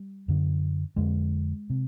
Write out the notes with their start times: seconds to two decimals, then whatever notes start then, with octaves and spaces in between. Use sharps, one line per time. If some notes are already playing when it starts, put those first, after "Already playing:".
Already playing: G3
0.28 F#2 D3
0.96 F2 D3 G#3
1.70 C3